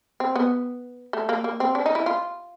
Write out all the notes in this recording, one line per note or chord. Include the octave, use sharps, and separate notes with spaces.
C4
B3
A3
A#3
A#3
C4
D4
D#4
E4
F4